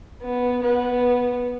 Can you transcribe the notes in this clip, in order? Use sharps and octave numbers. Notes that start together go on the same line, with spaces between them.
B3
B3